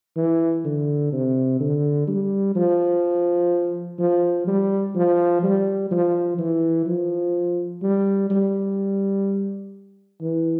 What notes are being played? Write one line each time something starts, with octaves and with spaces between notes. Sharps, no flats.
E3
D3
C3
D3
G3
F3
F3
G3
F3
G3
F3
E3
F3
G3
G3
E3